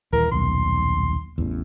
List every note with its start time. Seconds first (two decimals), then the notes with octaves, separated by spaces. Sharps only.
0.13 D#1 E3 A#4
0.32 D#1 B1 C6
1.38 A1 E2